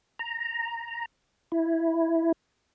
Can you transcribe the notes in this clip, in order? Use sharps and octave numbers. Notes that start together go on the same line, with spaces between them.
A#5
E4